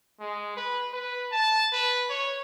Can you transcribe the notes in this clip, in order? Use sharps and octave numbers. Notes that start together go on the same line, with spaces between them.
G#3
B4
B4
A5
B4
C#5